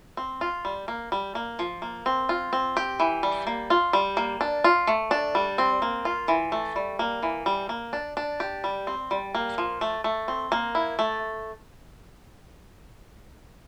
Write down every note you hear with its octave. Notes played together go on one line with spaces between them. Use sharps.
C4
F4
G3
A#3
G3
A#3
F3
A#3
C4
F4
C4
G4
E3
G3
A#3
F4
G3
A#3
D4
F4
A3
D4
G3
C4
A#3
F4
E3
A3
G3
A#3
E3
G3
A#3
D4
D4
G4
G3
C4
G3
A#3
F3
A3
A3
C4
A#3
E4
A3